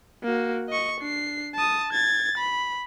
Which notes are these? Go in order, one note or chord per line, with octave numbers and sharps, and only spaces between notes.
A#3 F#4
D#5 C#6
D4 C7
A5 D#6
G#6 A6
B5